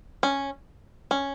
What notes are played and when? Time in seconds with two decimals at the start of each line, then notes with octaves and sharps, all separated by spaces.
0.23 C#4
1.11 C#4